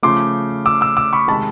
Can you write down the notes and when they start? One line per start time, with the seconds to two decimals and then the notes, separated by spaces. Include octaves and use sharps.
0.03 C#3 F3 A3 C6 D6
0.66 D6 E6
0.81 D6 E6
0.97 D6 E6
1.13 B5 C#6
1.28 C3 D#3 G#3 A5 B5